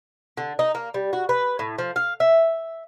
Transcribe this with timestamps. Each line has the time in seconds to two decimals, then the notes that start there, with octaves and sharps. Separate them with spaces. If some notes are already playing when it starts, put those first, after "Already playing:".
0.37 D3
0.59 D#4
0.75 A#3
0.94 G3
1.13 F#4
1.29 B4
1.59 A2
1.78 F3
1.96 F5
2.20 E5